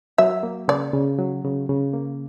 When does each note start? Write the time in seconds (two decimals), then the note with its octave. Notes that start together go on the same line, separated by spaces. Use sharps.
0.18 F#3 E5
0.43 A#3
0.68 C#3 D5
0.94 C#3
1.19 F#3
1.44 C#3
1.69 C#3
1.93 A#3